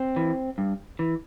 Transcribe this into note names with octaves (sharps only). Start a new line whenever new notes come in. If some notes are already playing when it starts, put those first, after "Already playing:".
Already playing: C4
E3
G2
E3